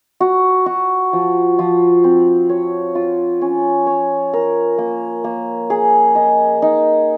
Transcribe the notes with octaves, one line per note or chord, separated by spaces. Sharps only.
F#4
F#4
F3
F3
C4
C#5
F4
C#4
C#5
A#4
A#3
A#3
G#4
D#5
D#4